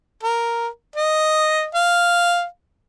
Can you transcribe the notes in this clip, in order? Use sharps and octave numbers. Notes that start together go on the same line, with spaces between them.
A#4
D#5
F5